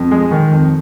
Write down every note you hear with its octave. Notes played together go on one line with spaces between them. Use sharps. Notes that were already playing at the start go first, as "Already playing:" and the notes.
Already playing: F2
G#3
D#3
F2